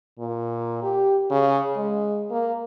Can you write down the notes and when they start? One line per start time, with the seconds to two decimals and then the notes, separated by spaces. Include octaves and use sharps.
0.19 A#2
0.82 G4
1.31 C#3
1.76 G#3
2.30 A#3